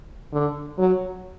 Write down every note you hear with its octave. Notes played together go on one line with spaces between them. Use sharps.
D3
F#3